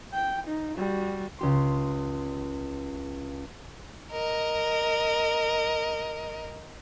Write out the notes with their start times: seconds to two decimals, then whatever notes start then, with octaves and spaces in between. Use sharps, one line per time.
0.13 G5
0.48 D#4
0.78 G3 F#4
1.39 C#2 G4 C6
4.11 A#4 D#5